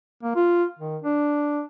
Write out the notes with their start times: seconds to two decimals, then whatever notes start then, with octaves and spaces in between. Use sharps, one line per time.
0.23 A#3
0.36 F4
0.79 D#3
1.02 D4